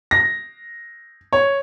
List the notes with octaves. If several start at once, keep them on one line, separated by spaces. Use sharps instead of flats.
A#6
C#5